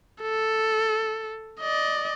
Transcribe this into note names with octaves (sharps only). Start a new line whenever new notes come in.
A4
D5 D#5